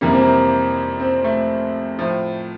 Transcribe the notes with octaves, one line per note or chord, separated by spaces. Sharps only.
F2 C3 E3 G3 A#3
C4
A#3
C4
A3
A2 F3